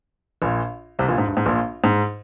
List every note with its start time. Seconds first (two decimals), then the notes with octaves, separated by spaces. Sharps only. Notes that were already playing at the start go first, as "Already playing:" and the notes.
0.42 A#1 A#2
0.99 C2 C3
1.08 A#1 A#2
1.18 G#2
1.27 G2
1.37 G#2
1.46 A#1 A#2
1.84 G#2